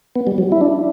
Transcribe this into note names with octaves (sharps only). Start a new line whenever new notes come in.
B3
G3
F#3
E4
D4